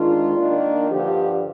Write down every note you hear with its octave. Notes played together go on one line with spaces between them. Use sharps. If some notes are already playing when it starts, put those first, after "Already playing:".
Already playing: G#2 D#3 G#3 D4 F4
D#3 A#3 D4
G2 D3 F3 G4